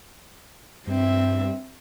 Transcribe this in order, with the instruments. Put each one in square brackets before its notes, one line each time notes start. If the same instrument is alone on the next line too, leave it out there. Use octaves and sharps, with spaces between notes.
[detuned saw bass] G2 [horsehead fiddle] C4 E5